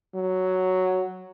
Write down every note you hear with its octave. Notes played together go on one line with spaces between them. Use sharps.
F#3